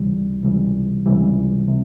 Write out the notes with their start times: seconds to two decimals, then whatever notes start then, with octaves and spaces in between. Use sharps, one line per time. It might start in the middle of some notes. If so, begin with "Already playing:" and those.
Already playing: C#2 C3 E3 G3
0.43 C#2 C3 E3 G3
1.06 C#2 C3 E3 G3
1.69 C3